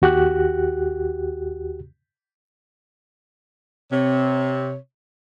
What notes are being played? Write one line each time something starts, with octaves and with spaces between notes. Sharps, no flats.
D#2 F#4 G4 F#6
C3 C#5